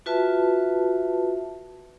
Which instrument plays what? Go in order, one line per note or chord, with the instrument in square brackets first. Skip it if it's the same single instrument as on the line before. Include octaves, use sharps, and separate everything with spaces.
[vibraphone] F4 F#4 B4 E5 A5